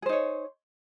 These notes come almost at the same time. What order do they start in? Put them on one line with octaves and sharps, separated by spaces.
G#4 C5 D#4 C#5